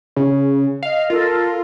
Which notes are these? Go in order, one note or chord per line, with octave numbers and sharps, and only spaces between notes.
C#3
D#5 F5
F4 A4 A#4